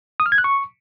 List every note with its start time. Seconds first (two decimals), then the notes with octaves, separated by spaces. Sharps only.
0.20 D#6
0.26 F6
0.32 G#6
0.38 F#6
0.44 C#6